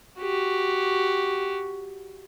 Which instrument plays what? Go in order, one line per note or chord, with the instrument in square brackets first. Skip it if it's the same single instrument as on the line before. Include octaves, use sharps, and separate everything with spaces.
[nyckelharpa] F#4 G4